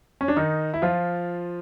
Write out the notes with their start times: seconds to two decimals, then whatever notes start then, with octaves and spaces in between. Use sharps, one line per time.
0.21 C#4
0.28 D4
0.36 D#3 D#4
0.74 E4
0.82 F3 F4